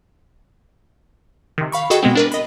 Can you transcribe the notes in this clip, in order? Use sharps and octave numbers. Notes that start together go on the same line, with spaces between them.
C3 D#3
F5 B5 C#6
F#4 G#4 A4 D#5 G5 C#6
B2 G#3 B3 C4
D4 A#4 B4
D#5 B5